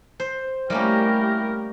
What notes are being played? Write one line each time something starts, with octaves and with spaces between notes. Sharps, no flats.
C5
G3 A3 A#3 C#4 E4 G4 A#4